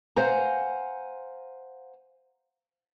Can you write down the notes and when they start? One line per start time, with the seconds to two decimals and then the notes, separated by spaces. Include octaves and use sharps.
0.16 C5 F5 F#5 G#5 A#5